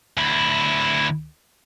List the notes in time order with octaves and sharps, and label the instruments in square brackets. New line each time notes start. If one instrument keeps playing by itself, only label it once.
[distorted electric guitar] D2 E4